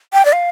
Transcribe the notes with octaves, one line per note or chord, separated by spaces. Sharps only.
G5
D5
F5